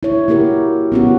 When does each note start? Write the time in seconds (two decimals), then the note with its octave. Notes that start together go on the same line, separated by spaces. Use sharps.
0.03 E4 C#5
0.28 A#3 E4 F#4 G4 A#4
0.92 B3 C#4 F#4